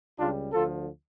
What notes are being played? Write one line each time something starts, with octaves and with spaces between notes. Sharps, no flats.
C#2 C#3 G3 D4 F4
D2 D3 F3 F4 A4